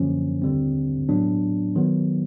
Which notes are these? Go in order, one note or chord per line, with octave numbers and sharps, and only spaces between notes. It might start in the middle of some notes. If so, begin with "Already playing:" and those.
Already playing: F#2 D3 F3 A#3 C#4
D#2 D3 G3 C4
A2 F#3 B3 D4
D#3 F#3 B3